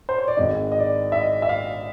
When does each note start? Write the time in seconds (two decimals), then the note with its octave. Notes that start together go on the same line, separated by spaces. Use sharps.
0.09 C5
0.18 C#5
0.28 D5
0.37 G#1 G#2 D#3 D#5
0.72 D#5
0.80 D5
1.12 E5
1.21 D#5
1.42 E5
1.49 F5